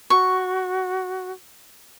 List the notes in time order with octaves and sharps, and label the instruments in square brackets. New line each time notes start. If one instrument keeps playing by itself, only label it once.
[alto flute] F#4 [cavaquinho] C#6